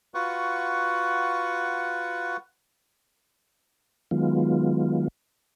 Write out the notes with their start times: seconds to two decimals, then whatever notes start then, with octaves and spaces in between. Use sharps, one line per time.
0.14 F4 F#4 B4 F#5 C#6
4.11 D#3 F#3 G#3 B3 F4